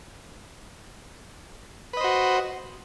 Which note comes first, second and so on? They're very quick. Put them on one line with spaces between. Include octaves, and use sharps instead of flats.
B4 D#5 C5 F#4